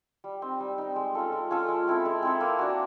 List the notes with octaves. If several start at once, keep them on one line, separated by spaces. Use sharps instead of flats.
G3
C4 D#4
G3
C4 D#4
G#3
C#4 F4 A4
G#3
C#4 F4 A4
G#3
C4 E4 A4
G#3
C4 E4 A4
A#3
D4 F#4